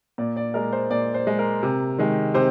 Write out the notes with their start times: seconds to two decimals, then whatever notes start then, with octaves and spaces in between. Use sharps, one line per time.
0.18 A#2 D5
0.37 D5
0.54 G#3 A#4
0.73 C5
0.91 A#2 D5
1.14 C5
1.27 G#3
1.39 A#4
1.63 C3
1.99 D#3 G#3
2.34 C3 C5